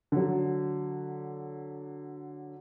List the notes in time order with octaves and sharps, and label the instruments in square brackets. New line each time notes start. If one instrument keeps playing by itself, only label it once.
[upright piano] D3 F#3